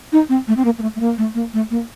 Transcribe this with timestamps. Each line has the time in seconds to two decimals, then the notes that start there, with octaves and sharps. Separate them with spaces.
0.12 D#4
0.29 C4
0.48 A3
0.57 C4
0.65 A#3
0.78 A#3
0.82 A3
0.95 A3
1.00 A#3
1.18 A3
1.35 A#3
1.53 A3
1.70 A#3